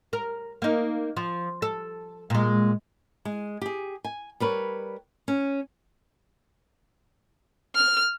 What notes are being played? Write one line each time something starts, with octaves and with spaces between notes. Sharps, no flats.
A#4
A#3 D#4
F3
A4
A#2 G#3
G#3
G4 G#4
G#5
G3 A#4 B4 C#5
C#4
F6